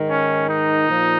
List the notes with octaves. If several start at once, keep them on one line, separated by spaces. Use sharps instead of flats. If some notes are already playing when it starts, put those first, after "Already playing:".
Already playing: G#2 D#3
C#4
D#4
A#2 F3